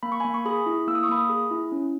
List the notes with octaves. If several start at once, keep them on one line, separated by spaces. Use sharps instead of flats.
A#3 B5
C#6
G#5 B5
A#3
C#6
G#4 B5 D#6
E4
A#3 E6
D#6
C#6
A#3 B5 D#6
G#4
E4
C#4